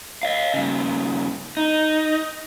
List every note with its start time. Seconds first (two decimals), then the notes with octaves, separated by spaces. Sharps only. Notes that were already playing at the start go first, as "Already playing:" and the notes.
0.23 D#5 F5
0.54 G2 C#3
1.57 D#4